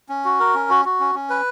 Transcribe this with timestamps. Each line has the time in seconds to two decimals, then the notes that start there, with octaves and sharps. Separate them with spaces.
0.09 C#4
0.25 F#4
0.40 A#4
0.54 C#4
0.70 F#4
0.85 F#4
1.00 C#4
1.15 C#4
1.30 B4